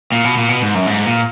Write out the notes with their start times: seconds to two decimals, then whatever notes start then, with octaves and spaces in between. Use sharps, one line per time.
0.12 A#2
0.25 B2
0.37 A#2
0.49 B2
0.62 G#2
0.74 F#2
0.87 G#2
1.06 A#2